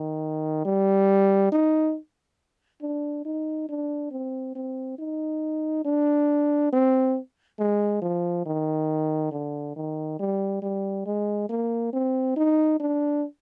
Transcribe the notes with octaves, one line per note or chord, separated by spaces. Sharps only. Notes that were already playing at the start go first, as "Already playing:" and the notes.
Already playing: D#3
G3
D#4
D4
D#4
D4
C4
C4
D#4
D4
C4
G#3
F3
D#3
D3
D#3
G3
G3
G#3
A#3
C4
D#4
D4